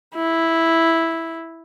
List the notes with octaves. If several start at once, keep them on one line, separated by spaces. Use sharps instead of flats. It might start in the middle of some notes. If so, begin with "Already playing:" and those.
E4